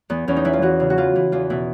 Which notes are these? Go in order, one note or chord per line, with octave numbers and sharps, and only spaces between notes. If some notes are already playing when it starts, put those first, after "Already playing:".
E2 B3
E2 C#4
D#4
E3 E4
F4
E3 F#4
C#3
F#4
E3 F4
E3
E2 F4
B2 E4